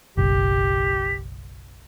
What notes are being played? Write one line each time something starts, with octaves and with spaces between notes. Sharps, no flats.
F#1 B1 G4